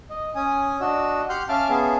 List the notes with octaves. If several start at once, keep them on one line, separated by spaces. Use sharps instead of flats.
D#5
C#4 G#5 D#6
D4 F#4 D#5 E6
G4 F#5 C6 F6 G6
C#4 E5 F5 A5 D6 F6
B3 C#4 G#4 E5 F5 A5